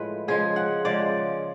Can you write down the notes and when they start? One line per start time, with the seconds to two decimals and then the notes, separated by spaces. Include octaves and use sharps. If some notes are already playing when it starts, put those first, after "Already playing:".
Already playing: A2 F3 G#3 B4
0.28 C#3 F3 G#3 G#4
0.56 F#5
0.85 C#3 F3 G#3 D5